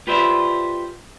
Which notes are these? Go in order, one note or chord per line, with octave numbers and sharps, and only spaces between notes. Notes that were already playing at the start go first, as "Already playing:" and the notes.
F4 G4 B4 C5 D5 E5